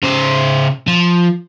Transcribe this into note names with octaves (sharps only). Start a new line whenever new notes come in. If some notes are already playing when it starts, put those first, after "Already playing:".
C#3 C5
F3